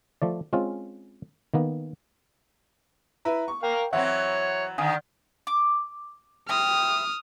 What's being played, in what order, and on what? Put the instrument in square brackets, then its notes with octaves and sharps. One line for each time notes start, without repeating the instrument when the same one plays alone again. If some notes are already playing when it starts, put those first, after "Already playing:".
[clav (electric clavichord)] F3 A3 D5
G#3 C4 C#4 F4
D#3 A#3 B3
[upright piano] E4 B4 [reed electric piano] A#5
[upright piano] C#6
[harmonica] A#4 F5 [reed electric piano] G5
[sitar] E3 F#3 C4 [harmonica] C#5 [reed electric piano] E5 [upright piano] F#5
[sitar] D3 D#3 [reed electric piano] F5 G#5 D#6
[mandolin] D6
[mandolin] C4 E4 G4 [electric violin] D#6 F6